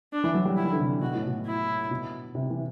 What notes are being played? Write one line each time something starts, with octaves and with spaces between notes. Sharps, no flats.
D4
E3
F#3
G3
E4
E3
D3
C3
B2 F#4
A2
B2
E4
B2
C3
E3